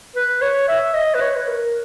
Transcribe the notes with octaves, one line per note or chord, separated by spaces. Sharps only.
B4
C#5
E5
D#5
B4
C#5
B4
A#4